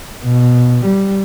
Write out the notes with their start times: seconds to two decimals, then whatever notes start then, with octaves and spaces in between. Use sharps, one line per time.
0.24 B2
0.85 G3